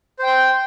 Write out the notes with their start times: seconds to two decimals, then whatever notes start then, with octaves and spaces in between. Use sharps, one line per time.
0.19 C5
0.23 G5
0.27 C6